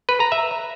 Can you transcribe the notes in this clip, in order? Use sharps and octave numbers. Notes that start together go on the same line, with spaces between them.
B4
A#5
E5